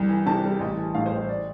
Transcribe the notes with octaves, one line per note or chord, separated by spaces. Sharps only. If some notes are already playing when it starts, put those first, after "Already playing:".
Already playing: C2
E3
C3 A5
G3
A1
E3
A2 F5
C5
A1
C5
D5